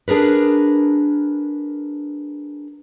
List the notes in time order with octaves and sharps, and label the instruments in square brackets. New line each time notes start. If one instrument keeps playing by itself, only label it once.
[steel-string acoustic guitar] D4 G#4 A#4 B4